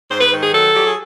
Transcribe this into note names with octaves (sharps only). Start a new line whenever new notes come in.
G#2 C5
B4
D#3
G#4
F#3 A4
F#3 G4
G#4